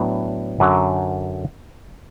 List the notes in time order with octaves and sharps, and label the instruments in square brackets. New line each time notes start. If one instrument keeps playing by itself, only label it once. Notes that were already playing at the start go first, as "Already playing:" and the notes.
Already playing: [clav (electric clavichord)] A2 F#3 B3 D4
F#2 D3 F#3